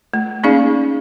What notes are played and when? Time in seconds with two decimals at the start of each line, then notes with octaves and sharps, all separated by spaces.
0.14 A3
0.43 A#3 C#4 D#4 G#4 D5 F5